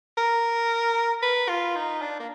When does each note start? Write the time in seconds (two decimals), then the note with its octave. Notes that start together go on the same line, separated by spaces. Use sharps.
0.18 A#4
1.22 B4
1.49 F4
1.75 D#4
2.01 D4
2.20 A#3